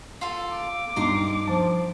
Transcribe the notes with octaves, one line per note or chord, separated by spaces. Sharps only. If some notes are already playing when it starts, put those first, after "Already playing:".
F4 A4
D6
G2 D#4 A#5 C6
F3 A5